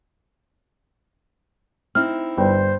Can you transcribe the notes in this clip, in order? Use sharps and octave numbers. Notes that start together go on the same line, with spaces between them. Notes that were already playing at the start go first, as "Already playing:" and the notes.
C4 D#4 E4 F6
G1 C5 G5